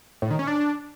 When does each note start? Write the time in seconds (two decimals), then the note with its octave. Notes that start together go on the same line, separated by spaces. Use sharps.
0.22 A2
0.31 D#3
0.39 C#4
0.47 D4